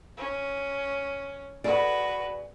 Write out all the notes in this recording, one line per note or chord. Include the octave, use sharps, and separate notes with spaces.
C#4
F#4 G#4 B4 D5